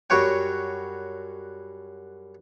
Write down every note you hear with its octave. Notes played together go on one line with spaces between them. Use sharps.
F#2 G3 F#4 C#5 G5